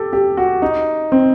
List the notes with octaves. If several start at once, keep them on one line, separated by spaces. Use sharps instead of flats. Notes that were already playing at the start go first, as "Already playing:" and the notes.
Already playing: G4 A4
G4
F#4
D#4
C4